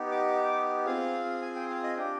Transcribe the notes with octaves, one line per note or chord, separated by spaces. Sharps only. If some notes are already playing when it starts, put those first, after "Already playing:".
Already playing: B3 D#4 G4
D6
C4 F4 G#4 F5
G#5
G5
F5
D#5
D4 G4 G5